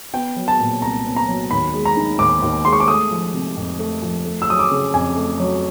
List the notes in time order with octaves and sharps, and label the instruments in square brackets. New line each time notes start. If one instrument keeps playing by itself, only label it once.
[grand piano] B3 G5
F#3
A5
A#2
C2 A#5
B3
A#5
F#3
D#2 B5
G#3
A#5
D#3
D#2 D6
D#2
G#3 C6
C#6
D6
A3 D#6
F3
C3
F2
A3
F3
A3
E6
F#3 D#6
D6
C#3
F2 G#5
A3
F#3